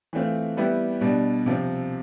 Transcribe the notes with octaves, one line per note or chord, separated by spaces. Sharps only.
E3 A3 C4 F4
G3 B3 E4 G4
B2 G3 D4
C3 F3 C4